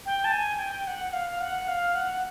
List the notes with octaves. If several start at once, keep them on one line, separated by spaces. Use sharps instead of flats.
G5
A5
G#5
G5
F#5
F5
F#5
F5
F#5